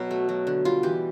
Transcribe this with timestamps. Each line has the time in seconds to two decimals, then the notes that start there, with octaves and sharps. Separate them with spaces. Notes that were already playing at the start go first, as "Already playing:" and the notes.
Already playing: B2 F#3 B3
0.11 A3
0.29 F#3
0.47 D3
0.65 G3 F4
0.83 E3 G4